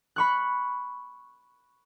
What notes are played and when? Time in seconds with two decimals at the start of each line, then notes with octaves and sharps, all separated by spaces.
0.16 B5 C#6 F#6